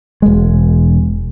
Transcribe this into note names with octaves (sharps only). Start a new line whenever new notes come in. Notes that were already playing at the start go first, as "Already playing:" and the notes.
E1 G#3